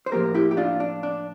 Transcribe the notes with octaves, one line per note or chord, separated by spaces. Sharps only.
C5
A2 F3 A#3 G4 A#4
E4 G4
G4
D4 F4
D4
D4